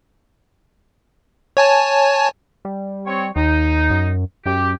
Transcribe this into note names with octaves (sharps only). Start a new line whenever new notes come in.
C#5 G#5 A5
G3
C4 C#5
D#2 D#4
F#2
F#2 G4